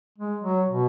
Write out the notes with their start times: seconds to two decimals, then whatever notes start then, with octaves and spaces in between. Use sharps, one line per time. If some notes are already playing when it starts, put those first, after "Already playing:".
0.18 G#3
0.43 F#3
0.68 B2